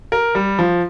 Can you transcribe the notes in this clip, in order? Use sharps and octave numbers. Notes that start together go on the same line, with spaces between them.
A#4
G3
F3